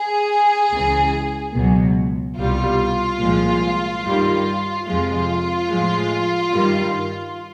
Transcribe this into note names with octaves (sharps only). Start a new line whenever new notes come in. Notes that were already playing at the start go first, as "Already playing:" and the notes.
Already playing: G#4
C#2 C#3 E3
C#2 B2 F#3
C2 B2 G3 F4
C2 A#2 F3 G#3
G2 D#3 G3
F2 C3 F3 G#3 F4
A2 F3 G#3
G2 D#3 G3